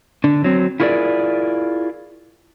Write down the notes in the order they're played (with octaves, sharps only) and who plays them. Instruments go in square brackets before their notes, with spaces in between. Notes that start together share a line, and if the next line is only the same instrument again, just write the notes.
[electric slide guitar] D3 D4
F#3 C4
E4 F4 G#4 A#4 B4 D5